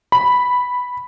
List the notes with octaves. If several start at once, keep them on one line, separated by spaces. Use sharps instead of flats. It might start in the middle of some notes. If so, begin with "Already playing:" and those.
B5